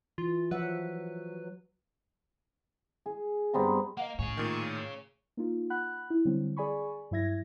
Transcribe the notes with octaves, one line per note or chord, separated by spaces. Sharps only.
E3 F4
F3 F#3 B4 E5 F#5
G#4
G2 B3 C4 A#5
A#3 D#5 F5 F#5
A2 G#4 C#5 G#5
A#2 D#3
A#3 D#4 F4
F#5 B5 F#6
E4
D3 F#3 G3 C4
G#4 D5 G#5 B5 C#6
G2 F#3 E4 E5 G#6 A#6